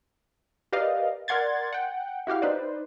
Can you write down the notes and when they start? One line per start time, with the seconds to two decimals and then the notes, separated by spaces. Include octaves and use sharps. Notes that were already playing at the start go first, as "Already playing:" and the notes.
0.72 G4 A#4 B4 D5 D#5 F5
1.28 A#4 D5 F#5 C6 G#6 A6
1.73 F#5 G5
2.27 E4 F#4 G4 F5
2.42 D#4 B4 C5 D5